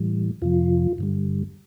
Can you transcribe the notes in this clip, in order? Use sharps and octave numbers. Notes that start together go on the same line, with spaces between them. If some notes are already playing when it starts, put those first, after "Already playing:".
Already playing: A2 E3 G3
F2 C3 F3 F4
G2 D3 G3